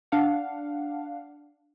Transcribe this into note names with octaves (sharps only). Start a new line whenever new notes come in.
D4 F5 F#5